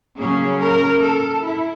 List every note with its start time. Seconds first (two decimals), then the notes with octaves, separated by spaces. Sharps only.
0.17 C#3 F#3 A#3 C#4 G#4
0.60 A#4
1.02 A4
1.45 E4